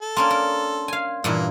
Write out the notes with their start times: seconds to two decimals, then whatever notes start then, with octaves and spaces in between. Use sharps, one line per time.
0.02 A4
0.17 A#3 C#4 D4 C6
0.30 A#4
0.88 F5 G#5
1.24 G2 A#2 E3 A#3